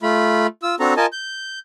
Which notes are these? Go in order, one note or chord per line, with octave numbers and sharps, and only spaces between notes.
A3 F4 B5
F4 E6
C4 D4 F#4 A4 A#5
F4 A#4 D#5 G#5 A5
G6